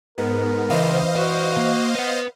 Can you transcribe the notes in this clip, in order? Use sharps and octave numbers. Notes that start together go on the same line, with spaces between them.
G#2 B3 A#4
C#2 E3 C5 D#5 F5
F#4 B4 D5
A#3
B4 F#5